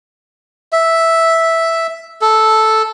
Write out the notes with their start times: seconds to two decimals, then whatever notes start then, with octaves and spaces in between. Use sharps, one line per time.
0.73 E5
2.22 A4